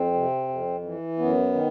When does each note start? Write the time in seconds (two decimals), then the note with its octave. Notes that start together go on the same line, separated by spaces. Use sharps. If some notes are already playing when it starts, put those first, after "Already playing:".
Already playing: F2 C4
0.13 C3
0.48 F2
0.83 E3
1.18 F#2 B3
1.53 D#3